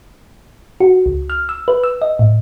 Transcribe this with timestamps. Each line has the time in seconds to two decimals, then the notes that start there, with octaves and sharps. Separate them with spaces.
0.80 F#4
1.06 C#2
1.30 F6
1.49 E6
1.68 B4
1.84 E6
2.02 D#5
2.19 A2